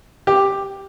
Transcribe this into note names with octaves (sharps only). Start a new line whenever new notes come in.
G4